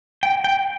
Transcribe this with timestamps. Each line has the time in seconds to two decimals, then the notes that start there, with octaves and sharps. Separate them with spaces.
0.23 G5
0.44 G5